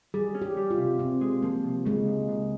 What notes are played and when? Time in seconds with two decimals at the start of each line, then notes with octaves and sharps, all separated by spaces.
0.14 G3 G#4
0.35 C#4
0.42 G4
0.57 G3
0.71 F4
0.78 C3
0.99 C2 C4
1.21 G#3
1.43 F3 A#3
1.64 C2
1.85 C#3 G#3
2.08 C#2
2.29 C#2